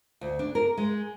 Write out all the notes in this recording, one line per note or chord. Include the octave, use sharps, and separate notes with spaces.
D2
D4
A#4
G#3